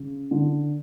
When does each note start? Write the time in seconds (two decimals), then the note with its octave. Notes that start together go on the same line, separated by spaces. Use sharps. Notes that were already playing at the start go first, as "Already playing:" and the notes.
Already playing: C#3
0.31 D3